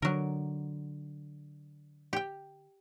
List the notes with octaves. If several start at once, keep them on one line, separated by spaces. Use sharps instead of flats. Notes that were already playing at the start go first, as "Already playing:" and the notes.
D3 F#3 A#4
G4 G5